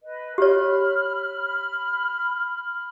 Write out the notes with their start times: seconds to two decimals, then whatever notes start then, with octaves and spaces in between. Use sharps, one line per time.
0.01 B4 D#5
0.38 G4 C#5 B5 F6